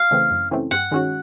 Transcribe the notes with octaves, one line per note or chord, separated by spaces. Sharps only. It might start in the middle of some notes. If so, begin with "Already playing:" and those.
Already playing: F5
C#3 E3 A3 C4
F#2
C#3 E3 A3 C4
G2 F#5
D#3 G#3 C#4 F#4